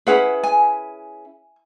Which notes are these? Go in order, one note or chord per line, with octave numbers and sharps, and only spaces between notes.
C#4 E4 G#4 B4 F#5
G#5